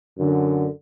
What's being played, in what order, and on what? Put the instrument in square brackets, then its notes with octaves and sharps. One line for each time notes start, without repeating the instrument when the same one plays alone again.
[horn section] F#2 D3